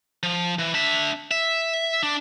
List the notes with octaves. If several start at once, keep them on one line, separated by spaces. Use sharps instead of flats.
F3
E3
D4 E5
E5
D4